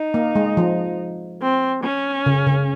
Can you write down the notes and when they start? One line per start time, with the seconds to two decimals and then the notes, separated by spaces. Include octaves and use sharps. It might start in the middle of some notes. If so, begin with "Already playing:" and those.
Already playing: D#4
0.14 A#3
0.35 G#3
0.57 F3
1.42 C4
1.84 C#4
2.26 C#3
2.47 C#3